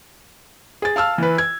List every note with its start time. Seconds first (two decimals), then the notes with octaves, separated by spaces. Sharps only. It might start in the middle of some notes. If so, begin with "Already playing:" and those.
0.82 G#4 A6
0.96 F5 A5 E6 F6
1.18 E3 B4
1.38 G#6